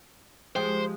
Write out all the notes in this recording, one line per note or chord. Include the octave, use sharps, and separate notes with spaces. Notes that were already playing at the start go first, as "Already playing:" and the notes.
F3 G#3 G4 C5